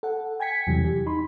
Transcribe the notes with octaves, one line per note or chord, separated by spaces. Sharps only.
A4 F#5
G5 G#5 G#6 B6 C#7
E2 C3 E3 F#3 G3
G4
D#4 B5 C6